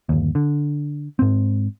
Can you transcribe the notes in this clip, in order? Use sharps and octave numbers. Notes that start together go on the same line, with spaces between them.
G1 D#2
D3
G#2 C4